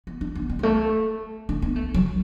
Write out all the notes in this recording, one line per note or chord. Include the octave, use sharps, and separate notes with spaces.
B3
D4
B3
B3
F#3
A3
D4
B3
A3
F#3